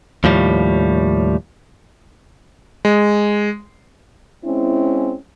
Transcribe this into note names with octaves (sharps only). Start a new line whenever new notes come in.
D#2 A2 F3 G3
G#3
G#3 C4 C#4 E4